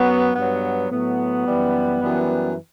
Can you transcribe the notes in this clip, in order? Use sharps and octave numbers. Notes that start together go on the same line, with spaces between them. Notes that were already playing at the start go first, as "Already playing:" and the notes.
Already playing: F#2 F#3 B3
G2 F#3 B3
A2 F#3 B3
F#2 E3 G3
F#2 E3 G3